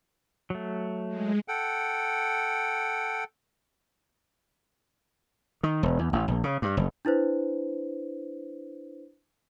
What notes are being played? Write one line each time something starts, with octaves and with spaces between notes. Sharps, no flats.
F#3 A3
G#3
A4 F#5 G5
D#3
E1
E2
A1
A#1
C#3
G2
F#1
D4 E4 B4 C5